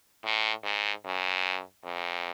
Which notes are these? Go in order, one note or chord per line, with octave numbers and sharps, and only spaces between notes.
A2
G#2
F#2
F2